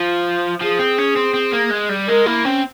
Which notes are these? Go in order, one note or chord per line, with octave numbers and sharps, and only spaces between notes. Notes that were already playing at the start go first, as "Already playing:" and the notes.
Already playing: F3 F4
F3 G#4
C4
C#4
C4
C4
A#3
G#3
G3
G#3 A#4
A#3 E4
C4 C#4